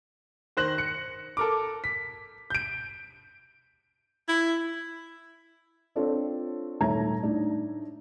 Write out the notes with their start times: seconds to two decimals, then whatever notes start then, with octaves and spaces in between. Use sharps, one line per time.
0.57 D#3 C5 F#6 A#6 F#7
0.78 C#7
1.37 A4 A#4 D6
1.84 B6
2.50 G6 D7
4.28 E4
5.96 C4 D4 F4 A4 C#5
6.80 D#1 D#3 A3 C#5 A#5 G#6
7.23 A2 D4 D#4